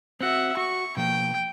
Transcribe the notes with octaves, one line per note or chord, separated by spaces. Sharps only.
C4 F#4 E5 F#5
F#4 C#6
B2 F3 A#3 G5